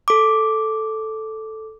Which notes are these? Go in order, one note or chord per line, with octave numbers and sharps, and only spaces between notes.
A4 D6